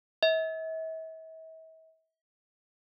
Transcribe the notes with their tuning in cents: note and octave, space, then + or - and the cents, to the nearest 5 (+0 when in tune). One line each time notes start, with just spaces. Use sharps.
E5 -45